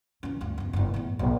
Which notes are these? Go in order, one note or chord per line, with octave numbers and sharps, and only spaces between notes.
E3 C#4
D2 G2
F#1 E2
F#1 E4
E2 A2
A#1